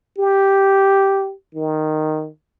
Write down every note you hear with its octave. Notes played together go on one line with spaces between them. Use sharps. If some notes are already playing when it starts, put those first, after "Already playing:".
G4
D#3